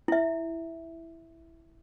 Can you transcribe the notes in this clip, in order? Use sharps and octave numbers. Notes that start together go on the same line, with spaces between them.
E4 E5